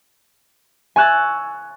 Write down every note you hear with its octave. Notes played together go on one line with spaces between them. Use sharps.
G#5 C#6 E6 F#6 G#6 A6